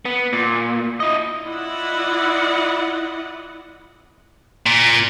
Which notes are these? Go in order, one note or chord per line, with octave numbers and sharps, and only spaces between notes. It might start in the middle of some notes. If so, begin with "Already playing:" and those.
B3
A#2
E4 D#5
E4 F4 D5 D#5 F#5
A#2